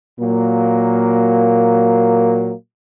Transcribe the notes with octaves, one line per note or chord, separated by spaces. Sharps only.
A#2 F#3 A#3